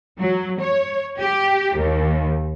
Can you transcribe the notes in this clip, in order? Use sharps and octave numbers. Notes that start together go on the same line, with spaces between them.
F#3
C#5
G4
D#2